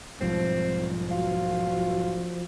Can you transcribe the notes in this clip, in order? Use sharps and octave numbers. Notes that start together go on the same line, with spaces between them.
B1 G#2 F3 G3 C4
F4 F#4